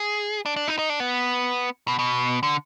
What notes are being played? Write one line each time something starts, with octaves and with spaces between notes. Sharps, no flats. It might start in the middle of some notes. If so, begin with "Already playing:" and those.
Already playing: G#4
D4
D4
D#4
D#4
D4
B3
B2
B2
D3